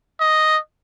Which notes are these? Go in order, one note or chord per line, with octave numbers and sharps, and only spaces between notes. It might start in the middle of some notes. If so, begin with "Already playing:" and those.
D#5